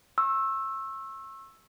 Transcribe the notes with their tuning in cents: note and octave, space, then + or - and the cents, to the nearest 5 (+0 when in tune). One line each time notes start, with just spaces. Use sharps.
C#6 -40 E6 +0